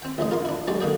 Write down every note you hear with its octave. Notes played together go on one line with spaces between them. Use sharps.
C4 G5
A1 D2 G#3 D#5
F4 A#4 C6
D4 E4
F#3 G#3 C#4 G4 D5
D3 A#3 G#4 G5